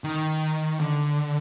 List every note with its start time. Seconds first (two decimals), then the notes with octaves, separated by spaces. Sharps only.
0.04 D#3
0.80 D3